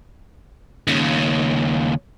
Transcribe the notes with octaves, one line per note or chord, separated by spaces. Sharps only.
D#2 C#3